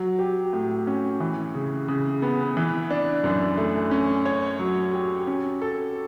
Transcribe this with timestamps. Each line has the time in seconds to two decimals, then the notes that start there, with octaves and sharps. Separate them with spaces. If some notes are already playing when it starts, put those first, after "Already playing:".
Already playing: F#3
0.19 G4
0.53 A2
0.87 C#4
1.20 E3
1.55 C#3
1.88 C#3
2.22 B3
2.57 E3
2.90 D4
3.24 F#2
3.58 A3
3.91 C#4
4.25 C#5
4.59 F#3
4.93 G4
5.27 C#4
5.62 A4